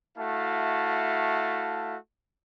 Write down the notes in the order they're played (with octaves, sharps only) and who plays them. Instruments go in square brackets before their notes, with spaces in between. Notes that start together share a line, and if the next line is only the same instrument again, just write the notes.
[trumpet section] A3 E4 F#4 F5 A5